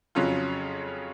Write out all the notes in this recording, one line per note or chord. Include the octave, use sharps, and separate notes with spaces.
F2 C#3 F#3 C#4 F4